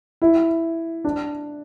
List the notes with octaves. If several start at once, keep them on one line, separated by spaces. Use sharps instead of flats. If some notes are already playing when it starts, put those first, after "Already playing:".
E4
D4